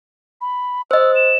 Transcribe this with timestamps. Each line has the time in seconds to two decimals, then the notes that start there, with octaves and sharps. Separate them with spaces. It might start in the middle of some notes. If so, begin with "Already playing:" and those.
0.41 B5
0.91 C5 D#5 E6
1.15 E7